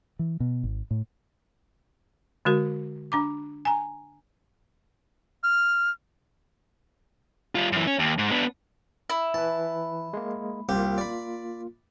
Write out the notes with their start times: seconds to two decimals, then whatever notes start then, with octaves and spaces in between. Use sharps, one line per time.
0.19 E3
0.40 B2
0.63 G#1
0.91 A2
2.45 D3 G#3 F#4 A#4
3.12 D4 A#5 D6
3.65 G#5 A#5
5.43 F6
7.55 G3 F4
7.72 F#2 E3
7.87 C#4
7.99 D#2
8.18 G#2
8.31 B3 D4
9.10 E4
9.34 E3 B4 A5
10.13 G#3 A#3
10.69 C2 A#3 F4 G4
10.98 D5 B5